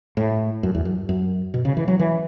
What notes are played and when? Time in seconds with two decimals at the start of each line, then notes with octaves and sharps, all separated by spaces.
0.17 A2
0.63 F#2
0.75 E2
0.85 F#2
1.09 F#2
1.54 B2
1.65 C#3
1.77 E3
1.88 F#3
1.99 E3